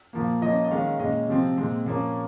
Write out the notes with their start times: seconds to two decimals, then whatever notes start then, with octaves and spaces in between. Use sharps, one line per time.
0.13 A#2 F3 A#3
0.42 F3 A#3 C#4 D#5
0.64 D#5
0.71 D#3 G#3 C#4 F5
0.99 A#2 G#3 C#4 D#5
1.28 C3 F3 C4
1.58 A#2 G#3 C4
1.86 A#2 F3 A#3 C#4